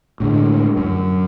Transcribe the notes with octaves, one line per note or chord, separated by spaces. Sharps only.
A2 D3 G#3
F#2